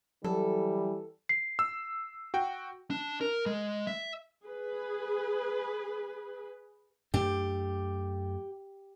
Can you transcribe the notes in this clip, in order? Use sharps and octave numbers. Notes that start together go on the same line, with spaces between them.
E3 F#3 G3 A4
C7
E6
F#4 G5
D4
A#4
G#3
E5
G#4 B4
F#2 A3 D4 G4